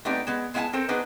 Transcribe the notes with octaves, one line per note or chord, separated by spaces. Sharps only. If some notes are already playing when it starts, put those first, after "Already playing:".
A3 B3 C4 D4 D#4 G4
G#3 B3
G#3 B3 E4 F5 G#5 A5
C4 A4 A#4 C5
B3 D4 D#4 G#4 B4 C5